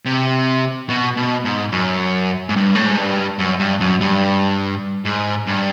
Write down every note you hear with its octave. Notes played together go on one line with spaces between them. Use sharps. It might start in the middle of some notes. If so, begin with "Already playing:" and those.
C3
B2
B2
G#2
F#2
G#2
G2
A2
G#2
G2
F#2
G2
F#2
G2
G#2
G2